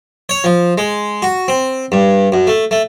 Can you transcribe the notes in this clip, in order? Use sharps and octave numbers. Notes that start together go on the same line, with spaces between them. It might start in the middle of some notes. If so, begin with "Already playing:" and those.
C#5
F3
G#3
F#4
C4
G2
F#2
A3
A3